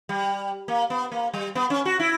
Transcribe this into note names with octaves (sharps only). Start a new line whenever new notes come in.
G3
A#3
B3
A#3
G3
B3
C#4
F#4
E4